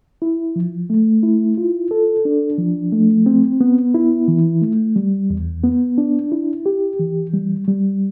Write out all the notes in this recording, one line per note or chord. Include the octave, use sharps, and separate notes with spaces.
E4
F3
A3
E4
F4
A4
D4
F3
A3
C4
B3
E4
E3
A3
G3
E2
B3
D4
E4
G4
E3
G3
G3